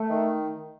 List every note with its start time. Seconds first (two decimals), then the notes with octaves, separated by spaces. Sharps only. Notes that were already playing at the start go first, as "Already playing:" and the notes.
Already playing: A3
0.10 D#3